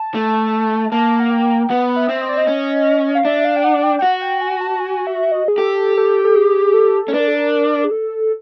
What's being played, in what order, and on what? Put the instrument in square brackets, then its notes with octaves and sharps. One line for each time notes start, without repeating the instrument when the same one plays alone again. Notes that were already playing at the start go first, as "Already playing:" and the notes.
Already playing: [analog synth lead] A5
[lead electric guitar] A3
[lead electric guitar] A#3 [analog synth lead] A5
[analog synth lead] F#5
G5
[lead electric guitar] B3 [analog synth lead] F#5
[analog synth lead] E5
[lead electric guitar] C4
[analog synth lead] D#5
D5
D#5
[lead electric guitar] C#4
[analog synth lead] F5
[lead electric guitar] D4 [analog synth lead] E5
[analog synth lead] F5
G5
F#5
G5
G5
[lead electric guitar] F#4 [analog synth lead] F#5
[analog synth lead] G5
G#5
A5
G#5
E5
D#5
G#4
[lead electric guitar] G4 [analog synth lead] A4
[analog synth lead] A4
A4
G#4
A4
[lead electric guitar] C#4
[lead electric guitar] D4 [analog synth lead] B4
[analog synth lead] A#4
A4
A#4
G#4
A4